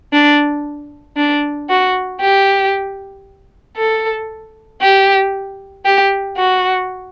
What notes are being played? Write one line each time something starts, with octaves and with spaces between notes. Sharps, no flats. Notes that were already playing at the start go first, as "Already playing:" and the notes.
D4
D4
F#4
G4
A4
G4
G4
F#4